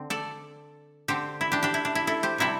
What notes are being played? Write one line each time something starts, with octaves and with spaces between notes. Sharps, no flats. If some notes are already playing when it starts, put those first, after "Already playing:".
Already playing: D3 C4
A4 D5
D3 C4 G4 C5
E4
D4 G4
D4 G4
E4
D4
E4
E4 A4
G4 C5
C3 G3 C4 E4 A4